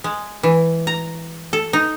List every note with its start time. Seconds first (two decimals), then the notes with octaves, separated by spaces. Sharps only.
0.04 G#3
0.43 E3
0.87 A#5
1.53 A4
1.73 D#4